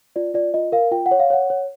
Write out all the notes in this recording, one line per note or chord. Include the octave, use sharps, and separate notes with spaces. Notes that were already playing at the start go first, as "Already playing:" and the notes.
F4 D5
F4 D5
F4 D#5
A#4 F5
F4 G5
F#5
C#5
F5
C#5 F#5
C#5